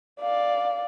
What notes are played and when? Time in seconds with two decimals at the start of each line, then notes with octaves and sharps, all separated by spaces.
0.21 D5 F5